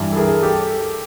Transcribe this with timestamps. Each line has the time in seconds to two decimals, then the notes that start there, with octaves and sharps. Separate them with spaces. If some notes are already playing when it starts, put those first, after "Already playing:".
Already playing: G2 E3
0.12 A4
0.16 G#4 A#4
0.43 G4 A4